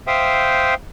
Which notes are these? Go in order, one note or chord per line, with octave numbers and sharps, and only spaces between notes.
C5 E5 F5 G5 D#6